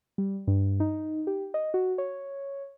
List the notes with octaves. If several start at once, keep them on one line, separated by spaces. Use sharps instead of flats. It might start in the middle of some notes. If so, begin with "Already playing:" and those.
G3
G2
D#4
G4
D#5
F#4
C#5